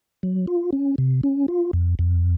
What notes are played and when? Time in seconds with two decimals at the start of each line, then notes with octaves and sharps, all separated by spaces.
0.23 F#3
0.47 F4
0.73 C#4
0.98 C3
1.23 C#4
1.48 F4
1.73 F2
1.99 F2